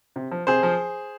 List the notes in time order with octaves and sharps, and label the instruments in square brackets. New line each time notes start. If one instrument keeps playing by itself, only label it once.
[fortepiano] C3
F3
C3 G#4 C5
F3